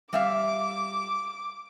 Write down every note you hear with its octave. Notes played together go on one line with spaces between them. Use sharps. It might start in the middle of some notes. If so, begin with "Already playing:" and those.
G3 E5 F5 D6